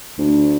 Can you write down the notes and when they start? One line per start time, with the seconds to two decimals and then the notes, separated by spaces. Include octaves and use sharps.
0.18 D2